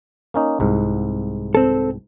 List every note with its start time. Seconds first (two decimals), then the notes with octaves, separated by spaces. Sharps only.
0.34 A#3 C#4 D#4
0.60 C2 G#2
1.55 C4 A4